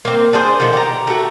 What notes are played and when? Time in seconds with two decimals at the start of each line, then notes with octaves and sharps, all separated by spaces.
0.05 A#3 C4
0.33 D4 G#4 C5
0.60 A#2 D3 D#3 F3
0.73 G4 A#5
1.07 A3 F#4